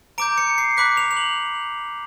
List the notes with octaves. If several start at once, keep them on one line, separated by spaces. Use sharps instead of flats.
A#5 D6 G6 D7
C#7
C7
B5 D6 F#6 B6
F7
F7
F#7